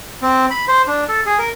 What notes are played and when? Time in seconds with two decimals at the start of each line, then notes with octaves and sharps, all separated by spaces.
0.22 C4
0.51 B5
0.68 C5
0.87 D4
1.09 A4
1.26 G#4
1.39 A#4